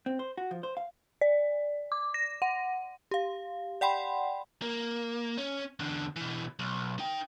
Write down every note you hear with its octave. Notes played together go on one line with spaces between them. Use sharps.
C4
C5
F#4
F3
C5
F5
D5
D6
A#6
F#5
G4 F5
D5 F#5 G5 B5 C6
A#3
C#4
E2 D3
B2 E3
B1
D#4 G5